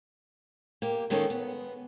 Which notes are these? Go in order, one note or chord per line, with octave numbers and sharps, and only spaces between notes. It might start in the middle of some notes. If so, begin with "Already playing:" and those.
A#3 G4
D#3 G#3 A#3 C#4 D#4 A4
B3